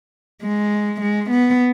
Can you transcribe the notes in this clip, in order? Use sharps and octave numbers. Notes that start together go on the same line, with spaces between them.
G#3
G#3
B3